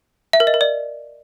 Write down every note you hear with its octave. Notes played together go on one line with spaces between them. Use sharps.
E5
A#4
D#5
A#4
D5